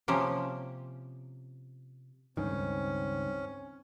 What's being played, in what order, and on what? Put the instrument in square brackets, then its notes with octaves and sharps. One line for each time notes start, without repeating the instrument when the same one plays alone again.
[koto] C3 F3 A#3 C#4 G4
[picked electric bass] C#2 G2 D#3 [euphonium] C4 [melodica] C#4